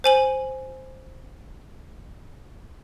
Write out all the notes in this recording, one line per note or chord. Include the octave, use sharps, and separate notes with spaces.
C5 G#5 F#7